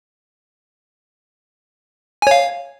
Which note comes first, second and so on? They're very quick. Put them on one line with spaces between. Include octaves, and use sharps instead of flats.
G#5 C#5 F5